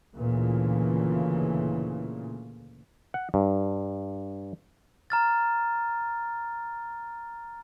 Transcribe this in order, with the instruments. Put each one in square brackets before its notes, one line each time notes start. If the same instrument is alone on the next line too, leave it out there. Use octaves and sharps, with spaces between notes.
[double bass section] D2 A#2 C#3 E3
[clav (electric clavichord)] F#5
G2
[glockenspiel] A#5 F6 A6